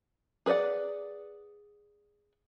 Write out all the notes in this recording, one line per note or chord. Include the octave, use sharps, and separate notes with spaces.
G#4 B4 C#5 D5 F#5